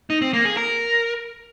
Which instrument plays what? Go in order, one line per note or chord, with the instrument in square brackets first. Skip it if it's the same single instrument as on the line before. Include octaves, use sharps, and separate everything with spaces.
[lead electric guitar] D#4
C4
A#3
G#4
A#4